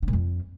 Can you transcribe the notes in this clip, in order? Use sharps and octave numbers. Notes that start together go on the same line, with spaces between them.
D3
A#2
F2